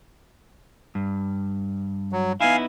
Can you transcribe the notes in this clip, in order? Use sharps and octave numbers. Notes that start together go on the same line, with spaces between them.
G2
F#3
B3 D#4 E4 F5 G#5